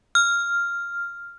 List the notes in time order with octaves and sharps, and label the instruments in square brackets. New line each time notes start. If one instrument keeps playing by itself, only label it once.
[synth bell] F6